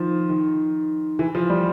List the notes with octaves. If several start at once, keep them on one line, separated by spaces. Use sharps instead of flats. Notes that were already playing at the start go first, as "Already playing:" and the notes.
Already playing: D#3 F3
D#3
E3
F3
G3